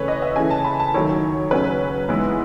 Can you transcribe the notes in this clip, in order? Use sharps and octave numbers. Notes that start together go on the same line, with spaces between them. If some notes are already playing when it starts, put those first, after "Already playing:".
Already playing: C#3 E3 A3 B4 C#5
D#5
E5
C#3 E3 A3 G#5
A5
B5
A5
D#3 F#3 A3 C#5
C#3 F#3 A3 C#4 B4
G#2 E3 B3 E4